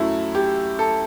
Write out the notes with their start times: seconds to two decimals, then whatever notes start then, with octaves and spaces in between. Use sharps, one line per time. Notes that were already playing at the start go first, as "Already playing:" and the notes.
Already playing: F#2 F#3 A3 E4
0.35 G4
0.79 A4